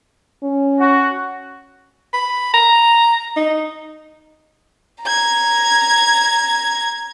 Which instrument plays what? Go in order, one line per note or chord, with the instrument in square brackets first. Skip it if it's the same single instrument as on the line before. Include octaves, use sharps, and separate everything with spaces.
[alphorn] C#4
[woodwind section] F#4
[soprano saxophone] B5
A#5
D#4
[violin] A#5 G#6